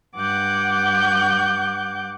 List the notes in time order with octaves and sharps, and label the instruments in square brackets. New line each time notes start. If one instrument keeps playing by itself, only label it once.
[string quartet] G2 F#5 D6 F#6 G6